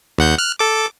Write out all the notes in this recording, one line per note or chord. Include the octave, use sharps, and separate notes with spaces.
D#2 F#5 G6
F6 F#6
A4 D6